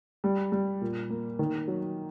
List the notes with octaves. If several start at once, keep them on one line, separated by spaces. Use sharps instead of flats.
G3
G3
A#2
A#3
D#3
F#3